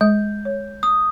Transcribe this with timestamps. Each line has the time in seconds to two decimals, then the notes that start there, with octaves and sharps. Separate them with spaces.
0.01 G#3 G6
0.45 C#5
0.83 D#6